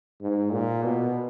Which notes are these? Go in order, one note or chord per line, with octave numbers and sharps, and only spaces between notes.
G#2
A#2
B2